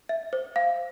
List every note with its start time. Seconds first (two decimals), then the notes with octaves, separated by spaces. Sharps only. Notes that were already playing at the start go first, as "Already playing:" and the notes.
0.09 E5
0.33 C5
0.56 F5